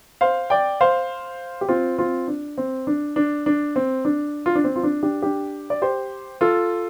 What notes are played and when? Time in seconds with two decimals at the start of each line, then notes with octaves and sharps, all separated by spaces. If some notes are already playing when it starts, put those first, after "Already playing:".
0.21 C5 F5
0.50 D5 G5
0.81 C5 F5
1.61 G4
1.69 C4 F4
1.98 C4 F4
2.28 D4
2.58 C4
2.87 D4
3.16 D4
3.46 D4
3.76 C4
4.05 D4
4.46 F4
4.55 D4
4.64 C4
4.76 F4
4.83 D4
5.03 D4 G4
5.22 D4 G4
5.70 D5
5.82 G4 C5
6.41 F4 A4